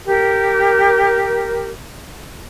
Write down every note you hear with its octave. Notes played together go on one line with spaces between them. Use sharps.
G4 A#4